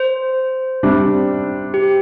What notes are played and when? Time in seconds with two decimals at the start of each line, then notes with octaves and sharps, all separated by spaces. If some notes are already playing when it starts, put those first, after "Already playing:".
Already playing: C5
0.83 C3 G3 D4
1.74 G4